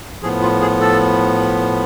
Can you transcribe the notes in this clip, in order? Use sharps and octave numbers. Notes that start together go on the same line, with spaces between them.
A2 F3 B3 G#4
F4
G#4
A4